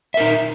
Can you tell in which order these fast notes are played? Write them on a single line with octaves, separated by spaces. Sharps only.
E5 A#4 D#4